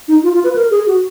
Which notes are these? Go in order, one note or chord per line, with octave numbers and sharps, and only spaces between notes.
D#4
F4
F4
B4
A#4
G#4
F#4